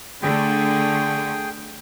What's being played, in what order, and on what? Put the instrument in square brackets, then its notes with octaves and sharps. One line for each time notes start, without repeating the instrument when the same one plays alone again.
[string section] D3 A3 [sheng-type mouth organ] G#4 G5